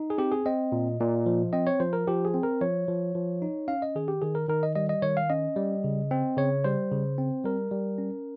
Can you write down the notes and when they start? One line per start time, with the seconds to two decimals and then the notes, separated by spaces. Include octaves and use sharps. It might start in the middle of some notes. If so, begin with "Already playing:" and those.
Already playing: D#4
0.10 G#4
0.18 C4 G4
0.32 G#4
0.46 C4 D#5
0.72 A#2
1.00 A#2
1.26 F3
1.53 C4 D#5
1.67 C#5
1.80 F3 C5
1.93 A#4
2.07 F3 G4
2.25 G#4
2.34 C4
2.43 A#4
2.61 F3 C#5
2.88 F3
3.15 F3
3.42 D#4
3.68 C#4 F5
3.82 D#5
3.95 D#3 G#4
4.08 G4
4.22 D#3 G#4
4.35 A#4
4.48 D#3 A#4
4.63 D#5
4.75 G3 D#5
4.89 D#5
5.02 D#3 C#5
5.17 F5
5.30 C#4 D#5
5.56 G3
5.84 C#3
6.11 C4
6.37 C#3 C#5
6.64 G3 C5
6.91 C#3
7.18 C4
7.44 G3 A#4
7.71 G3
7.98 C#4